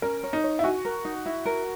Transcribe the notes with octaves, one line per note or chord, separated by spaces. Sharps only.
C#4 A#4
C#5
D#4
C#5
E4
F#4 G#5
A#4
D#4
E4
A#4